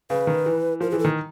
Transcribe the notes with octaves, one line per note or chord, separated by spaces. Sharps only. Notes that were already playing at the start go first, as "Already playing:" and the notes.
C#3 B4
D#3
E3
F3 A#4
E3 G#4
A4
D#3